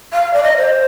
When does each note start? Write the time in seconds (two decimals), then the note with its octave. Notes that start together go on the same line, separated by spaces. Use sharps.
0.13 F5
0.33 D5
0.43 D#5
0.58 C5